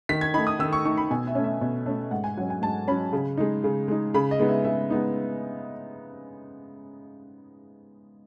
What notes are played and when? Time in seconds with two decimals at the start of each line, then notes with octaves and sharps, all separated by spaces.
0.09 D#3 B6
0.21 G#6
0.34 A3 D#4 B5
0.47 D#6
0.59 D#3 E6
0.73 C#6
0.85 A3 D#4 C#6
0.98 B5
1.10 B2 G#5
1.27 E5
1.35 A3 C#4
1.44 E5
1.61 B2
1.86 A3 C#4
2.11 G#2 F#5
2.24 G#5
2.37 F#3 C#4 F#5
2.50 G#5
2.62 G#2 A5
2.88 F#3 C#4 B5
3.13 C#3
3.37 G#3 D#4
3.64 C#3
3.88 G#3 D#4
4.14 C#3 B5
4.31 D#5
4.39 G#3 B3 D#4
4.48 E5
4.64 C#3 E5
4.90 G#3 B3 D#4